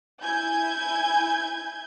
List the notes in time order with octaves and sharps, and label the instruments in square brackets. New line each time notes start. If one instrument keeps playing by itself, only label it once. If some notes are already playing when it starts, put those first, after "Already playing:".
[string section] E4 G#5 G6 G#6